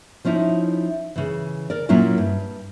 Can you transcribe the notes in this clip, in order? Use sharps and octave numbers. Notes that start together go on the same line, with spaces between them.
F3 C#4 D#4 E4
C#3 E3
A#4 D5
A#2 F#3 A#3 C#4 E4 F4
G2